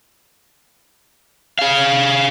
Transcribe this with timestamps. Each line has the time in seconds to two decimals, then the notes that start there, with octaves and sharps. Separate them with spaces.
1.59 G#4 F5